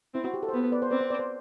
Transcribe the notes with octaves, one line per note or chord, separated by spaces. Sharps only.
C4 E4
F#4
G4
A4
C5
B3 B4
B4 D5
C5
C4 B4 D5
C5
B4 D5
C5